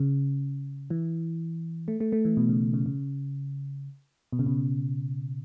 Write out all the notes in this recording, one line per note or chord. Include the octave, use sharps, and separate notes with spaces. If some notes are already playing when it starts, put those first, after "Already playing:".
Already playing: C#3
E3
A3
A3
A3
E3
B2
C#3
C#3
C#3
B2
C#3
B2